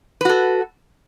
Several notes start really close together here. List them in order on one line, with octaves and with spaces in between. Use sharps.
B4 F#4 A4